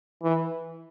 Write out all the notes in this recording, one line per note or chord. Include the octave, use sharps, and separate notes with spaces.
E3